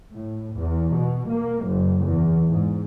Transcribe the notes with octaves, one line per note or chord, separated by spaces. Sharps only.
A2
E2
B2
A#3
F#1
E2
G#2